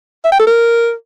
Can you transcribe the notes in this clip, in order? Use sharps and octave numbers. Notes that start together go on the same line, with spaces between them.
E5
G5
A4
A#4